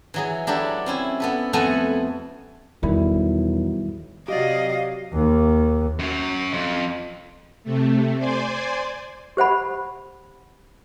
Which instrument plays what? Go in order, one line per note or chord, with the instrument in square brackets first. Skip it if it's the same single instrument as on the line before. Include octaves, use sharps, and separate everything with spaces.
[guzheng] E3 F#3 G#4
F#3 D4 E4 G4 A4
C4 C#4 E4
B3 A4 B4
F2 A3 B3 A4 F#5 G#5
[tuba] B1 [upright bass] E2 [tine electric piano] D#3 G3 E4
[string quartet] C3 F#3 [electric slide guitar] G4 D5 [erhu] D#5 [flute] F5
[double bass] D#2
[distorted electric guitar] F#2 F#3
F2
[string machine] C3 A3
C5 D5 G#5 C6
[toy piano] G4 C5 F#5 B5